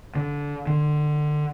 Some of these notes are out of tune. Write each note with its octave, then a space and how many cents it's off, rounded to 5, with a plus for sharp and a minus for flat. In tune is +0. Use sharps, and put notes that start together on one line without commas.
D3 -20
D3 +25